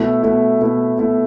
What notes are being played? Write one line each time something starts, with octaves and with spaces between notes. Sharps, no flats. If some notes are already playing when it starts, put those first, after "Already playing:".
Already playing: B2 A3 E4
B2 A3 E4
B2 A3 E4
B2 A3 E4